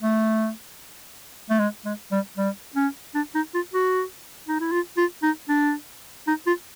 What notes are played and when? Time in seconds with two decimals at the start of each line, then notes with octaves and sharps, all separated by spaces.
0.03 A3
1.50 A3
1.60 G#3
1.85 G#3
2.12 G3
2.37 G3
2.76 C#4
3.15 D4
3.35 D#4
3.54 F4
3.74 F#4
4.48 D#4
4.61 E4
4.72 F4
4.97 F4
5.23 D#4
5.49 D4
6.27 D#4
6.47 F4